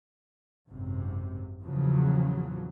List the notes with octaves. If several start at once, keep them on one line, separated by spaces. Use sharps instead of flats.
G#1 F#2 C3
E2 A#2 C#3 F3 F#3